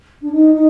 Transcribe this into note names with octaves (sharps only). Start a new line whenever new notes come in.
D4
D#4
D#4